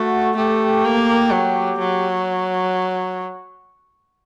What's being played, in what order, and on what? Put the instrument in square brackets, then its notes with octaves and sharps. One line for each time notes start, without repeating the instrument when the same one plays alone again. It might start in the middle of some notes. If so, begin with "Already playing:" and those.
Already playing: [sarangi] A3 [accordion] F#4
[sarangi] A3 [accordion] G4
[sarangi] A#3
F#3
F#3